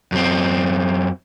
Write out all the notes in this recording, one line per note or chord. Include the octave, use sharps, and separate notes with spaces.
F#2 C4